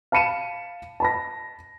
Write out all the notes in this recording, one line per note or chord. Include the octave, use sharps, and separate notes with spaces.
F5 A5 B5 C#7 D#7 E7
A5 B5 A#6